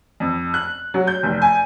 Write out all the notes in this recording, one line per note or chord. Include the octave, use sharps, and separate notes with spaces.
F2
F#6
F#3
G6
F1
G#5